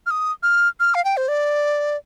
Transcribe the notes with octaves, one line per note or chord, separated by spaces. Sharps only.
F6
D#6
F6
F6
F5
G5
C5
D5